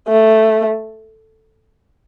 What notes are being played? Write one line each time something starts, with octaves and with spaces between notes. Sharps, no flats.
A3